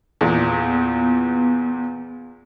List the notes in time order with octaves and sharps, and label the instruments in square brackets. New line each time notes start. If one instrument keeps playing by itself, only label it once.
[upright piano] E2 A#2 [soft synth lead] B3